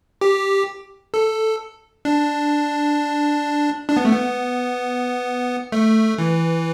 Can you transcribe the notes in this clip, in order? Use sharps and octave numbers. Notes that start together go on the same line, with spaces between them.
G4
A4
D4
D4
B3
A3
B3
A3
E3